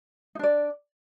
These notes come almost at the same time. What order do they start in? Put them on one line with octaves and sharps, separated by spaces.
D#4 D4 D5